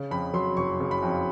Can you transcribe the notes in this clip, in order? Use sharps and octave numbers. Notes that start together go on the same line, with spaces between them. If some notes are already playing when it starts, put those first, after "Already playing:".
Already playing: C#3
F2 B5
F#3 C6
F#1 C#6
C#3
B5
F2